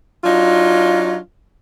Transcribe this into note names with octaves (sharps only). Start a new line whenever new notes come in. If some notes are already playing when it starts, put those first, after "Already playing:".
F#3 D4 D#4 F4